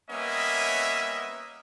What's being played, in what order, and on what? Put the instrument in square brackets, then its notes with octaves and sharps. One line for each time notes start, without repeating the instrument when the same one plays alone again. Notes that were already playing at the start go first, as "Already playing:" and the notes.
[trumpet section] G3 A#3 B3 C#4 D#5 E5